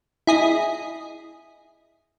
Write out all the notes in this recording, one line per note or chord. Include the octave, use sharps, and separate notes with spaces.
E4 G#4 D#5